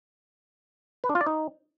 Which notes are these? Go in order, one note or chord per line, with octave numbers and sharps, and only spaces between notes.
B4
D4
F4
D5
D#4